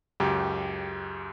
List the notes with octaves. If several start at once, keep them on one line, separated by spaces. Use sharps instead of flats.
C#2 F#2 G4